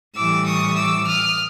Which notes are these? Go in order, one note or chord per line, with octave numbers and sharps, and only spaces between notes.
A2 E3 G3 D6 E6
C#6 D#6
D6 E6
D#6 F6